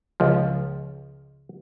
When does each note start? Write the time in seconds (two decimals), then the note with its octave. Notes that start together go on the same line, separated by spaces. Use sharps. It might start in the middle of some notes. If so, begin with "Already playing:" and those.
0.20 C#2 F3